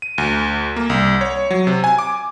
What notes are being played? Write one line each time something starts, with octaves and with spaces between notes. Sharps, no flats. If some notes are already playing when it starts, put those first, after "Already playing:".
D#7
D2
A#3
C2
C#5
F#3
C3
G#5
D6